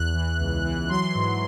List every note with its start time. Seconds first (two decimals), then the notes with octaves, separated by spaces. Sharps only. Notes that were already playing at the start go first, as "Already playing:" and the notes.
Already playing: E2 F#6
0.14 E3
0.40 C#2
0.65 E3
0.89 F#3 C6
1.15 G#2